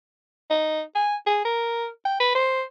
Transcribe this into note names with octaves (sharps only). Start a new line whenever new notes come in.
D#4
G#5
G#4
A#4
G5
B4
C5